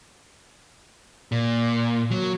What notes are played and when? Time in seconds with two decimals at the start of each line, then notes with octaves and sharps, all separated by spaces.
1.32 A#2
2.11 F#3